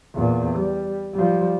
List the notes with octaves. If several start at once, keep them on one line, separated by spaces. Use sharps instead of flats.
E2 A#2
G3
F3 G3